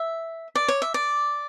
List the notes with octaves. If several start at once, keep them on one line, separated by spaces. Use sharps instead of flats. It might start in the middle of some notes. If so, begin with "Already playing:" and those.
Already playing: E5
D5
C#5
E5
D5